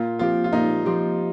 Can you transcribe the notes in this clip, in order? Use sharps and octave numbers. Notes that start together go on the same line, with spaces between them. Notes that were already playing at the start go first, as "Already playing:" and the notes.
Already playing: A#2 F4
F3 C4 F4 G4
F4
A#2 D#4
F3 C4 G4